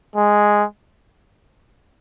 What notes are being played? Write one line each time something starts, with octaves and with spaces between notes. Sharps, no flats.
G#3